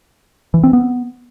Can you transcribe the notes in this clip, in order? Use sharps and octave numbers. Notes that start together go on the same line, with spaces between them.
E3
C4
B3